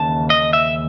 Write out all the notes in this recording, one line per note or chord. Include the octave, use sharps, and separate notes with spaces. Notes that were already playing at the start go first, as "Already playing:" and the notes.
Already playing: D#2 C#3 E3 A5
D#5
E5